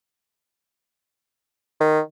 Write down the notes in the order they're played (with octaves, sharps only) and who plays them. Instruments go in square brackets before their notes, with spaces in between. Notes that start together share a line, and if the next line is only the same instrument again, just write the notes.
[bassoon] D#3